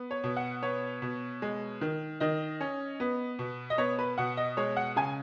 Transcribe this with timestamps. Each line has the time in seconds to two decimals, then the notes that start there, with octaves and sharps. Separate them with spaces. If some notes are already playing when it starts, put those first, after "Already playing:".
Already playing: B3
0.11 C#5
0.24 B2
0.37 F#5
0.62 B3 C#5
1.02 B2
1.42 G#3
1.81 D#3
2.20 D#3 D#5
2.61 C#4
3.00 B3
3.39 B2
3.70 D#5
3.78 B3 C#5
3.99 B4
4.18 B2 F#5
4.37 D#5
4.57 G#3 C#5
4.76 F#5
4.96 C#3 G#5